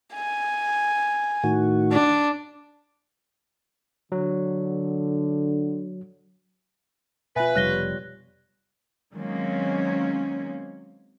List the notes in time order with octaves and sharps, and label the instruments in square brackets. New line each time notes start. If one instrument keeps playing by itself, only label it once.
[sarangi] G#5
[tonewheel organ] A2 D#3 F#4
[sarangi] D4
[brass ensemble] D3 [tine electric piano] F#3
[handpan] B2 F4 [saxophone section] B4 [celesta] E5 G#5
[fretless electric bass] F1 [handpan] G3 C#5 [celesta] F#6 A#6 G7
[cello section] D#3 F#3 G#3 A#3 C4 C#4